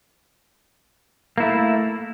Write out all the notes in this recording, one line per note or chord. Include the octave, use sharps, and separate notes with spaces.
A3 A#3 E4